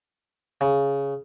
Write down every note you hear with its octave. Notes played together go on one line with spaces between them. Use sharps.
C#3